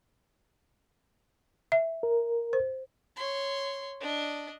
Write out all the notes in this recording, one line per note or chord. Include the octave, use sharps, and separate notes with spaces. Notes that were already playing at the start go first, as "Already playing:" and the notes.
E5
A#4
C5
C#5 C6
D4 D#5